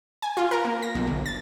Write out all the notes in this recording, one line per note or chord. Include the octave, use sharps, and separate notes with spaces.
G#5
F4
A#4
A#3
A#6
B1
G1
A6